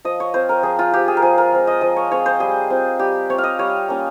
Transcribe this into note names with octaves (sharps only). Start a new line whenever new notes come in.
F3 D#5
C#5
C4 F4 C5
A#4
F3 G#4
F4
C4 F4 G4
G#4
A#4
F3 G#4
A#4
G#3 C4 F4
D#5
F3 D#5
C#5
G#3 C4 F4 C#5
C5
G3 G#4
C4 F4
G3 G4
C4 F4 C#5
F5
D#5
G3 C#5
A#3 C#4 F4